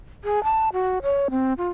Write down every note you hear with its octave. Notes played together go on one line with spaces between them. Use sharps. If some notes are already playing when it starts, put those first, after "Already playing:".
G#4
A5
F#4
C#5
C4
F4